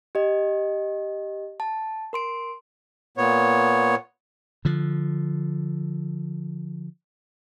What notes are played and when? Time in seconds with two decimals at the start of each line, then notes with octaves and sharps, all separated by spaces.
0.15 G4 D#5
1.60 A5
2.13 A#4 C6 D7
3.18 A#2 B3 C#5
4.65 D3 F3